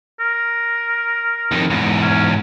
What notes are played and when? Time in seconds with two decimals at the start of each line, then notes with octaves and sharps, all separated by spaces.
0.20 A#4
1.52 F2 D#3
1.70 E2 G#2
2.01 C#4